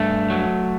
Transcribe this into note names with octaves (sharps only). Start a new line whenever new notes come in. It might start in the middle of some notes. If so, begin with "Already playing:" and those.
Already playing: G2 A3
F#3